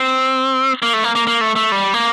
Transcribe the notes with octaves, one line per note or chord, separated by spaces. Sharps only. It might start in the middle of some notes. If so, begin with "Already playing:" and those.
Already playing: C4
A#3
A3
A#3
A#3
A#3
A3
A3
G3
A#3